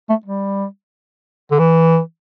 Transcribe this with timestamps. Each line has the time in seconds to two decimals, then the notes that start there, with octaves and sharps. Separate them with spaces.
0.10 A3
0.26 G3
1.51 D3
1.59 E3